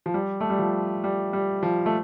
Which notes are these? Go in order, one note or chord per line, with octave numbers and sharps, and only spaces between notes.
F3
G3
A3
G3
F3
G3
G3
F3
A3